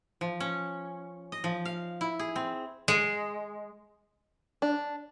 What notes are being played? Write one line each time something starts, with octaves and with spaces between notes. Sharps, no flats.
F3
C#4
D#5
F3
F5
E4
G#4
C4
G#3
D4